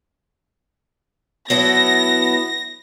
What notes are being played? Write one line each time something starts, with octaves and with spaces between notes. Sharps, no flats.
F#3 B3 E4 A4 A#6